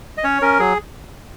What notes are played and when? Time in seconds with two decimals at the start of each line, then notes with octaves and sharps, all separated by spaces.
0.18 D#5
0.24 C#4 C#5
0.42 C#4 A#4
0.59 F#3 G#4